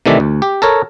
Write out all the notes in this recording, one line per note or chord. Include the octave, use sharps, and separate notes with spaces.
C3 D#3 E3 A3 D5 E5
D2
G4
A4 A#4 C#5